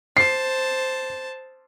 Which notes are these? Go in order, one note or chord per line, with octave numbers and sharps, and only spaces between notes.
C5 A5 C7